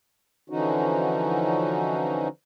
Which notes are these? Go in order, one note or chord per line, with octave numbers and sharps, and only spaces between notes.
D3 E3 F3 C#4 D#4 F#4